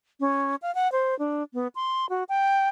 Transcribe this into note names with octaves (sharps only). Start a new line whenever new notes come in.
C#4
F5
F#5
C5
D4
B3
C6
F#4
G5